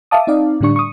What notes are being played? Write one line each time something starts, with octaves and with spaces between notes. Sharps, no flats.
E5 F5 A5 D6 D#6
C4 D#4 D5 F5
A2 D3 G3 D4 C#6
C#6 D#6